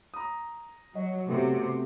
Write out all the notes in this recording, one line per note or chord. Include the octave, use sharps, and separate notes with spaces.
A#5 D#6
F#3 D#5
C3 A3 B3 F#4